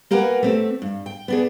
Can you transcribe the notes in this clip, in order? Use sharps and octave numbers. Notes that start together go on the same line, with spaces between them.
A#3 G4 A#4 B4 F#5 G#5
A3 C4 G4
G2
G5
B3 D4 G#4